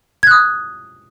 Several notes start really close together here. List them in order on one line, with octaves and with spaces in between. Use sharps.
G#6 F#6 D#6